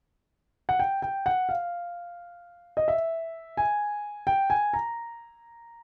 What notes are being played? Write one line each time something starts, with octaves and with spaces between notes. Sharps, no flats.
F#5
G5
G5
F#5
F5
D#5
E5
G#5
G5
G#5
A#5